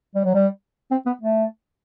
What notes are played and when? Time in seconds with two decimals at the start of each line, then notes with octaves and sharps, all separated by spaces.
0.15 G3
0.24 F#3
0.34 G3
0.91 C4
1.06 B3
1.22 A3